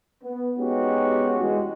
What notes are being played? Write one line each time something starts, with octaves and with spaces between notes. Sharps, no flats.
B3
G#3 B3 C#4 D#4 F#4 G4
E2 G#3